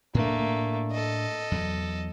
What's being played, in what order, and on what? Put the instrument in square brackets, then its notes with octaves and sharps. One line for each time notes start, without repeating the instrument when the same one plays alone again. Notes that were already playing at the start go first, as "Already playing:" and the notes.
[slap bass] A2 D4 [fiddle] A3 A#3
[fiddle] A4 D#5
[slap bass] E2 F#3